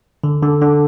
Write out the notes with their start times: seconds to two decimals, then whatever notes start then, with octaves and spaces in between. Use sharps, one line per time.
0.24 D3
0.43 D3
0.62 D3